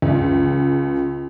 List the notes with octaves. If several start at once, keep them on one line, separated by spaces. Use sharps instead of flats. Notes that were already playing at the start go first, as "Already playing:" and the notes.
C#2